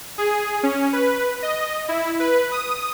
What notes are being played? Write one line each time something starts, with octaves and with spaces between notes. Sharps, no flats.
G#4
C#4
B4
D#5
E4
B4
D#6